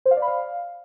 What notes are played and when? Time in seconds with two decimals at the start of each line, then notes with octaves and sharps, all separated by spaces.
0.06 C5
0.11 F5
0.17 D5
0.22 B5
0.28 F5